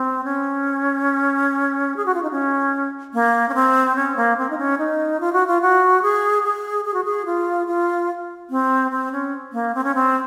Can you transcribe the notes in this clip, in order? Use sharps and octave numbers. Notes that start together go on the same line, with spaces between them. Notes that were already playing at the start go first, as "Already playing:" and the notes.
Already playing: C4
C#4
G#4
F#4
F4
D#4
C#4
A#3
C#4
C4
C#4
A#3
C4
D#4
C#4
D#4
F4
F#4
F4
F#4
G#4
G#4
G#4
F#4
G#4
F4
F4
C4
C4
C#4
A#3
C4
C#4
C4